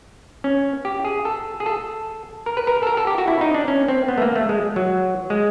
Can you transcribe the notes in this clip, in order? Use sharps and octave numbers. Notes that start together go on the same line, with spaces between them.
C#4
G4
G#4
A4
G#4
A4
A#4
B4
A#4
A4
A#4
A4
G4
F#4
E4
D#4
D4
C#4
C4
B3
A3
A#3
A3
G#3
F#3
G#3